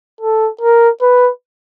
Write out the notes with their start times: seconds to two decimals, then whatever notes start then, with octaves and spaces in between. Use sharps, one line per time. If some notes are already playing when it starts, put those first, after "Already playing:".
0.21 A4
0.61 A#4
1.02 B4